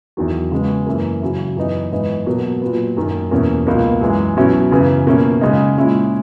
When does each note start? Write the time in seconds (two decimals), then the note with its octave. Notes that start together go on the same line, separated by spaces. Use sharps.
0.17 E2 D#3 F#3
0.52 C#3 G#3 B3
0.87 F#2 E3 A#3
1.22 C#3 F#3 C#4 E4
1.56 F#2 E3 B3 D#4
1.92 G#2 E3 B3 D#4
2.26 B2 F#3 A#3
2.61 A#2 F#3 B3
2.97 F#2 D#3 A#3
3.31 E2 B2 A#3 C#4
3.67 C#2 B2 A#3 D#4
4.01 F#2 E3 G#3
4.37 B2 F#3 C#4 E4
4.71 F#2 C#3 E3 B3
5.07 B2 A#3 C#4 E4
5.41 C#3 G#3 D#4
5.76 A#2 G#3 C#4 E4